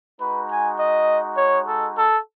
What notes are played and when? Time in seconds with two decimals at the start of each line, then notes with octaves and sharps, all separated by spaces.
0.20 G#3 D#4 F#4 B4
0.50 G#5
0.79 D#5
1.37 C#5
1.66 A4
1.96 A4